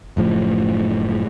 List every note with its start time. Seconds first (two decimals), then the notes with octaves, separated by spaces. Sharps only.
0.17 F#1 A2 F3